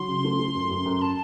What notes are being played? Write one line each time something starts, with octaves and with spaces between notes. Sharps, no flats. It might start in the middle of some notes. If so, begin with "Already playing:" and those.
Already playing: F#3 C6
C#3
A3
A3
F#2
F#2
F#2
A5